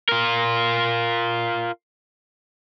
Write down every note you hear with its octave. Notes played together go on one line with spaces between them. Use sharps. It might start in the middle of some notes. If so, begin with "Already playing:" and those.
F4 A#4